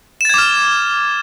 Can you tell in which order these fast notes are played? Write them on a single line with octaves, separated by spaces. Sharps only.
E7 A6 G#6 D6 F6